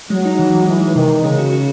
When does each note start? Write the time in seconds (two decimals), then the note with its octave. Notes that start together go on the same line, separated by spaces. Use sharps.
0.10 F#3 G#3
0.25 D#4
0.39 E3
0.52 G#3
0.67 E3 G#3
0.82 G#3
0.95 C3 D#3
1.09 C3
1.23 C#3 G#3
1.38 F#4
1.52 F#4